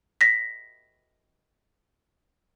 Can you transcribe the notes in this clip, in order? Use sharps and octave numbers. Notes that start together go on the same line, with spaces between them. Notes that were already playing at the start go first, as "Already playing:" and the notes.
A#6 B6